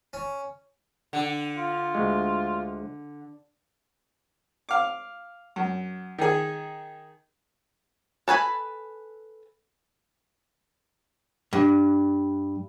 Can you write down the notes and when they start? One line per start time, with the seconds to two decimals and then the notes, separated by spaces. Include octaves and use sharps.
0.13 C#4
1.13 D3
1.58 F4
1.95 D2 G#3
4.69 F5 D6
5.56 F#2
6.18 D#3 G#4
8.28 A4 B4 G#5 B5
11.53 G2